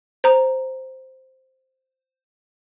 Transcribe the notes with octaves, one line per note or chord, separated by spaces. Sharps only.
C5 A#5